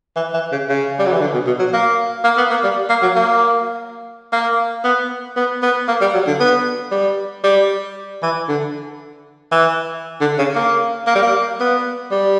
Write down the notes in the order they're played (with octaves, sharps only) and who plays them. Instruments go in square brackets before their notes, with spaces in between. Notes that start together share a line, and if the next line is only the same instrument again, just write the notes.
[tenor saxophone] E3
E3
C#3
C#3
G3
F#3
E3
D3
B2
B2
F#3
A#3
A#3
B3
A#3
G3
A#3
F#3
A#3
A#3
B3
B3
B3
A#3
G3
F#3
D3
B3
G3
G3
E3
D3
E3
D3
C#3
A#3
A#3
G3
A#3
B3
G3